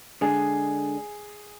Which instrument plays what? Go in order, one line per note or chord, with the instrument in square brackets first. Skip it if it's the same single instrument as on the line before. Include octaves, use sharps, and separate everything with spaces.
[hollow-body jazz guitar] D3 G#3 D4 [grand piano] G#4